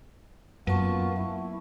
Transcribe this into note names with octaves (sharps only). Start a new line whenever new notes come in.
F#2 F#3 A#3 B3 F4 A5 C#6
E4